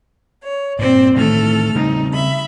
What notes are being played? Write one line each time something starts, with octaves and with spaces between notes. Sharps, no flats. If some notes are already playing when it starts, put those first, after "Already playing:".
C#5
G2 A#2 C4 C5 D5
A2 D#3 E3 A3 A4 F6
C#3 G3 C4 D#4
E5 B5